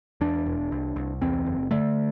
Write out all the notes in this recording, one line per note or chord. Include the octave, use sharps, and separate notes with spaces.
E2 D4
E1
C2
C2
E2 C4
F#1
D3 A3